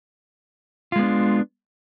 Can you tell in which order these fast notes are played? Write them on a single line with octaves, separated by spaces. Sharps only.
F4 G#3 B3 D4